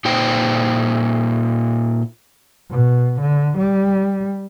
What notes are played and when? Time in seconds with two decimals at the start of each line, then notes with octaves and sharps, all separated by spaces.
0.05 A#2 D#4 C5 G5
2.70 B2
3.21 D3
3.58 G3